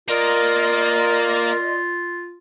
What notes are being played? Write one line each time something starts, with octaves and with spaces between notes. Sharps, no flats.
A#3 F4 A#4 D5 D#5 C6